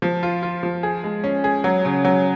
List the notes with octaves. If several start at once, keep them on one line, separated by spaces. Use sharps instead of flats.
F3
F4
F4
F3
G#4
G#3
C#4
G#4
F#3
C#3
F#3